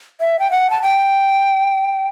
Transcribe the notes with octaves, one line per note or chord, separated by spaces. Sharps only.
E5
G5
F#5
A5
G5